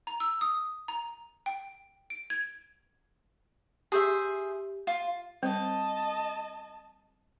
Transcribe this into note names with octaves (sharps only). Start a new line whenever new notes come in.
A#5
E6
D#6
A#5
G5
D7
G#6
G4 G#4 C5 E5
F4
G3 C4 C5 D#5 A5